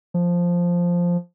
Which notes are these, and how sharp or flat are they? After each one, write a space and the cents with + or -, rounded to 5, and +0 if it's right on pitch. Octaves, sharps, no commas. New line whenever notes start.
F3 +0